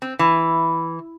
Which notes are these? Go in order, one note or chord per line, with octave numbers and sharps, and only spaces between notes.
C4
E3